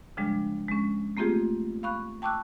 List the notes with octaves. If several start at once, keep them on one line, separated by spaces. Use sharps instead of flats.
C#3 F3 G3 G#3 D4
G#3 C#4
A3 A#3 C4 F4 G4 G#4
F5 B5 C#6 F#6
G5 A5 C#6 D6 E6 F#6